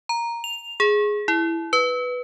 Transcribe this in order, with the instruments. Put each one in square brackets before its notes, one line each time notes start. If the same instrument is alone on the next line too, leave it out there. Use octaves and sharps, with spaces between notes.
[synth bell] A#5
F7
G#4
E4
B4